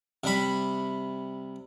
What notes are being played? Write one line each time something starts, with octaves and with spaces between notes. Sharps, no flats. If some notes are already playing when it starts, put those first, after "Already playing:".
C3 G3 B5